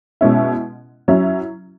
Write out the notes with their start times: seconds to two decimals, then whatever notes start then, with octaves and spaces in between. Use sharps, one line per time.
0.21 B2 G#3 C#4 E4
1.08 F#3 C#4 E4